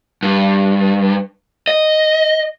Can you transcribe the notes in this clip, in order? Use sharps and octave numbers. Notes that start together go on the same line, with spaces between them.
G2
D#5